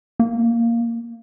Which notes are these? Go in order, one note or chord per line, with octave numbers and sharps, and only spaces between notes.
A#3